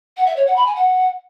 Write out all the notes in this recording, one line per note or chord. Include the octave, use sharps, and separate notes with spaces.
F#5
E5
C#5
F#5
B5
G#5
F#5